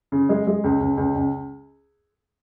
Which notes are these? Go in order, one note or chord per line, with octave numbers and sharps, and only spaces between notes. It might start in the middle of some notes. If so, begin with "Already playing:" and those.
C#3
G#3
G#3
C#2
C#2
C#2
C#2